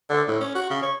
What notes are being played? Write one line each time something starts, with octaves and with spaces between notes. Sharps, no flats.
D3
A2
C#4
F#4
C#3
C#5